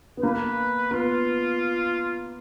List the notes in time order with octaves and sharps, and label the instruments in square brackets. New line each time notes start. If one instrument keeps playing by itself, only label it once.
[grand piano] B3
[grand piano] A#3 [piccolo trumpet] B4
[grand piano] B3 [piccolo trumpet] F4